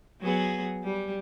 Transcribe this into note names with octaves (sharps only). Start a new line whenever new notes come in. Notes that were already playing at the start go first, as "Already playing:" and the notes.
F#3 B3 G#4
G3